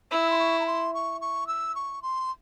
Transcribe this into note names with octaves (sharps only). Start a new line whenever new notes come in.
E4 E6
C6
C#6
A#5
C6
C#6
C#6
E6
C#6
C6